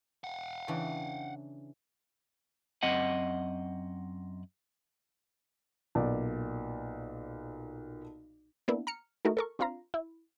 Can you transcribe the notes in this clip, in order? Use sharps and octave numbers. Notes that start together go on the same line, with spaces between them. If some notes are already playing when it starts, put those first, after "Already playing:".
F5 F#5
C#3 E3 D4
F#2 C4 D#5 F#5
B1 A#2 D5
A#3 B3 D4 E4
A#5 F6 C#7
A3 D#4 E4 F#4 A#4
A4 A#4 C#6
C4 D4 F4 F5 A#5
E4